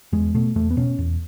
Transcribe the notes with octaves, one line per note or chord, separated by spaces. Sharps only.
E2 G#3
B2 A3
E2 A3
B3
B2 C#4
E2